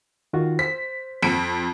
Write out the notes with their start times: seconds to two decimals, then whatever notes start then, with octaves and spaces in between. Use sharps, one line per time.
0.33 D#3 F4 F#4
0.59 C5 B6
1.23 F2 B6 D7